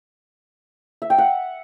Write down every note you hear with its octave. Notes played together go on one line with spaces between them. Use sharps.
E5
G5
F#5